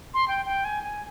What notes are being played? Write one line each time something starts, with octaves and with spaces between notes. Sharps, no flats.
C6
G5
G5
G#5
G#5